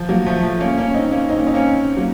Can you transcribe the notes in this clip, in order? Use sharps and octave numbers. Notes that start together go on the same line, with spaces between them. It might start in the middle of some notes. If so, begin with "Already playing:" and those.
Already playing: F3
F#3 A#3
F3 A3
F3
A#3 C#4
A#3 C#4
C4 D#4
A#3 C#4
C4 D#4
A#3 C#4
C4 D#4
A#3 C#4
F#3 A#3